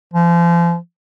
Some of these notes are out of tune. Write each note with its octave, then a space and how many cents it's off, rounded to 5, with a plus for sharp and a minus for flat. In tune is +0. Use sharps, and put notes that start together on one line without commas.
F3 -35